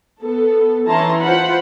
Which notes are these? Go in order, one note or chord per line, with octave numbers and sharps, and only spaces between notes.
B3 A4
E3 C#4 E4 A5 A#5 C6
F4 C5 F#5 B5